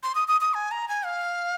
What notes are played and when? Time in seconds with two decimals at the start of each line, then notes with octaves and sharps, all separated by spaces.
0.03 C6
0.15 D#6
0.28 D#6
0.41 D#6
0.54 G#5
0.71 A#5
0.88 G#5
1.05 F5